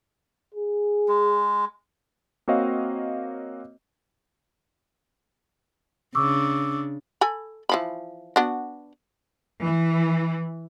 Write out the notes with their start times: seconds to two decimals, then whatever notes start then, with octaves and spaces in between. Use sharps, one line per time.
0.54 G#4
1.09 G#3
2.48 A#3 C4 F#4 C#5 D#5 F5
6.15 C#3 D4 C#6 D6 E6
7.21 A4 G#5 B5
7.69 E3 F3 B5
8.36 B3 D4 F#4
9.62 E3